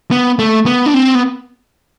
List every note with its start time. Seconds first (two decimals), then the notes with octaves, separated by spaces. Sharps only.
0.11 B3
0.39 A3
0.66 B3
0.86 D4
0.94 C4
1.15 B3